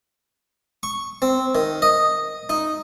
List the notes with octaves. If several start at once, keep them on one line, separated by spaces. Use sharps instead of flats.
C#6
C4
D#3
D#5
D#4